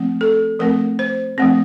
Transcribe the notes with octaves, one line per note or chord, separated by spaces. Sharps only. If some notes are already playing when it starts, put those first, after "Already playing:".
Already playing: F3 A3 C4
A4
F3 A3 C4 A#4
C5
F3 A3 C4